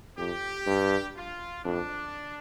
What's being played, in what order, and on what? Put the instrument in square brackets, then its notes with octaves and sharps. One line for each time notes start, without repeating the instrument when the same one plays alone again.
[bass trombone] F2 [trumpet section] G4
[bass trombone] G2
[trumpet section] F4
[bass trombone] F2 [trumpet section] D4